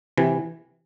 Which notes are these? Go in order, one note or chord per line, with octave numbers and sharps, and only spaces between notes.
C3 E3